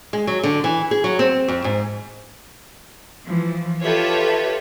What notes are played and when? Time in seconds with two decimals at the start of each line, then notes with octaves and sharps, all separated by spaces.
0.13 G#3
0.27 F#3
0.43 D3
0.64 E3
0.91 G#4
1.04 F#3
1.19 C4
1.48 F2
1.64 G#2
3.24 E3 F3
3.83 F4 G4 A4 B4 C#5 E5